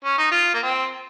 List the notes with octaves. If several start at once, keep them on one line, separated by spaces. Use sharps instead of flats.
C#4
D#4
F4
A#3
C4